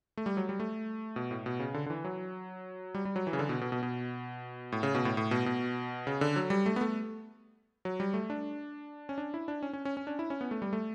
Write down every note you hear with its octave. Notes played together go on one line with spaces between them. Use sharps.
A3
G3
F#3
G3
A3
B2
A2
B2
C#3
D3
D3
E3
F#3
G3
G3
F#3
E3
C#3
D3
B2
B2
B2
B2
A2
C#3
B2
A2
A2
B2
B2
C#3
D3
F#3
G3
A3
B3
A3
F#3
G3
A3
D4
C#4
D4
E4
D4
C#4
C#4
C#4
C#4
D4
E4
C#4
B3
A3
G3
A3